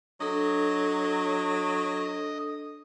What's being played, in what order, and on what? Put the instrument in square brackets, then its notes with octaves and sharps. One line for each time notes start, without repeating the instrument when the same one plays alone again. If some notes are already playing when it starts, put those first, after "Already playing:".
[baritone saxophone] F#3 [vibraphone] D4 A4 [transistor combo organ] D#5